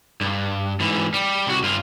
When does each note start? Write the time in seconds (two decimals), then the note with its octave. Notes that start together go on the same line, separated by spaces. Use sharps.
0.21 G2
0.80 G#2 E3
1.14 G3
1.47 C2 F#4
1.64 G2 F4